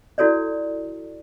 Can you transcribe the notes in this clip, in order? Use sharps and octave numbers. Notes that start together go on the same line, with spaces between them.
E4 F#4 A4 C#5 D5